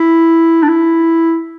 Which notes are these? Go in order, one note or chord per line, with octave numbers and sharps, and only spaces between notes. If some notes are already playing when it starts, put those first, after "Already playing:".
Already playing: E4
D4
E4